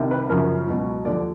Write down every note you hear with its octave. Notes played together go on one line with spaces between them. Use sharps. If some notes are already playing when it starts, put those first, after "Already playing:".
Already playing: C2 C3 D#3
B4
F#2 C#3 F3 A#4
C#2 B2 F#3
D#2 D3 F3 D5